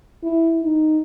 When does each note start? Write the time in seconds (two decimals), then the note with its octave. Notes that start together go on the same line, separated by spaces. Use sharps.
0.23 E4
0.63 D#4